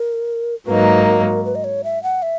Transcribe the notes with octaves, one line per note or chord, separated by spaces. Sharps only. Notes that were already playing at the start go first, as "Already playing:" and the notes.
Already playing: A#4
G#2 F#3 A#3 D#4 B4
A#4
B4
D#5
C#5
E5
F#5
E5